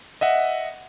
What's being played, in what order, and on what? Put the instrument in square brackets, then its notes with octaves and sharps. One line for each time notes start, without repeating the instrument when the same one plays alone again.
[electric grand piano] D#5 E5 F#5